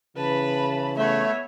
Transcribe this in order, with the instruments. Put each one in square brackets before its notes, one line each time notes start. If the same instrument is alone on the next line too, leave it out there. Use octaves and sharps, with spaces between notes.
[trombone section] C#3 E3 [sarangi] B4 [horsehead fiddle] A5 B5
[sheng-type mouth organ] A3 [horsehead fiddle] B3 C#5 [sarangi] E5